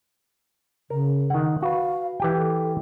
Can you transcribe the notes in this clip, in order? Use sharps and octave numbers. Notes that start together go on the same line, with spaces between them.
C#3 A#4
D#3 F#5
F#4 B4 F5
E3 G4 G5
A4